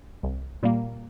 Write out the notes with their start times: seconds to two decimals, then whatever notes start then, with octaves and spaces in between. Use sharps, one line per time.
0.23 C2
0.63 A#2 G3 A#3